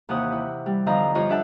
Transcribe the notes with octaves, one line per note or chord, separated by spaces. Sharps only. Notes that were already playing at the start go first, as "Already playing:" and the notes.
D#2 C3 E3 F#5 D#6
E4
G3
E2 D3 F3 D#5 F5 A#5
G2 F3 F4 C#5 D#5 C#6
D4 G4 A4 E5 F#5 A5